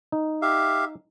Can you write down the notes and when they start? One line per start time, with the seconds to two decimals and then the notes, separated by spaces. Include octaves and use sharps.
0.12 D#4
0.42 G4 E5 F5